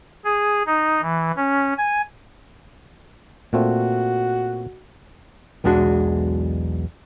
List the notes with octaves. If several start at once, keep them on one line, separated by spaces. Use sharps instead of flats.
G#4
D#4
E3
C#4
G#5
A#2 A3 C4 F#4
B1 E2 G#3 D4 F#4